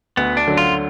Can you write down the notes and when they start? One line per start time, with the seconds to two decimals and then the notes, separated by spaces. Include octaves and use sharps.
0.17 D2 B3
0.37 D4
0.47 D3 F#3
0.57 F4